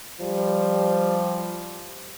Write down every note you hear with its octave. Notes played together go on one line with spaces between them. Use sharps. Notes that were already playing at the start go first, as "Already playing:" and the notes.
F3 G3